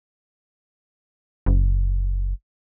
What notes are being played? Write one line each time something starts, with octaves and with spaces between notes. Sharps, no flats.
F#1